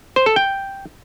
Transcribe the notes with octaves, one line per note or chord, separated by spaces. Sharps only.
C5
A4
G5